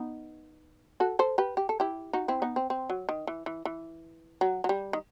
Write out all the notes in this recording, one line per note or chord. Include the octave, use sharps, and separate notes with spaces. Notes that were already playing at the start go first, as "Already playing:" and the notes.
Already playing: B3 D#4
F#4 A4
A4 C5
G4 B4
G4
A4
E4 G4
D#4 F#4
C4 E4
B3 D#4
C4
C4
F#3
D#3
E3
E3
E3
F#3
F#3
G3
D#3